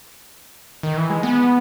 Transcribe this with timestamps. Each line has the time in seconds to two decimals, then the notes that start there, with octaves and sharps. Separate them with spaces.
0.83 D#3
0.97 E3
1.10 G#3
1.23 B3